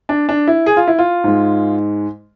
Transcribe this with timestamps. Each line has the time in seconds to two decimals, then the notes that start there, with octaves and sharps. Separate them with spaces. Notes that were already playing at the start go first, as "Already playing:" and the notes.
0.09 D4
0.29 D4
0.47 E4
0.66 G#4
0.77 F4
0.87 E4
0.99 F4
1.24 G#2 G#3